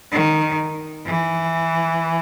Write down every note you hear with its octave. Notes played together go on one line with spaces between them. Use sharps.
D#3
E3